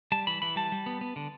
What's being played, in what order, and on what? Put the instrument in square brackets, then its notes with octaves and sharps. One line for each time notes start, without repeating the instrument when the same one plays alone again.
[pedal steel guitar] G3 A5
E3 B5
E3 B5
G3 A5
G3
B3
B3
D3